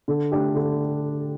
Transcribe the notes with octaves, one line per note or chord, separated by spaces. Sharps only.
D3
A3 D4 G4 D5
D3